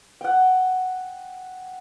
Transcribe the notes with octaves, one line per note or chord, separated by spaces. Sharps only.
F#5 G5